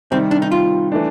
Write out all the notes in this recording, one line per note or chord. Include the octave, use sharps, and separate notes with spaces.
C3 D#3 G3 C4
D4
D#4
F4
E3 A3 D4